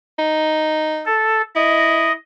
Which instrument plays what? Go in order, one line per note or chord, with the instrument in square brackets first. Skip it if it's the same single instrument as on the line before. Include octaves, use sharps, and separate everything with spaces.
[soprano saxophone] D#4
[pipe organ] A4
[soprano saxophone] E4 [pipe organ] D#5